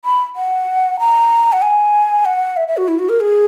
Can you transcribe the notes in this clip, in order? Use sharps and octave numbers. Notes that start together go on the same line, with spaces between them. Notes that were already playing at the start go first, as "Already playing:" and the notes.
B5
F#5
A#5
F#5
G#5
F#5
E5
E5
F#4
E4
F#4
A#4
G#4